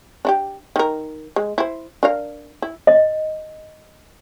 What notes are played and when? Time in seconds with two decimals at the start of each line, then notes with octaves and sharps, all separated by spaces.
0.25 D4 E4 G4
0.76 D#3 A#4
1.36 G#3
1.58 E4 C5
2.03 D4 A#4 F5
2.62 E4
2.87 D#5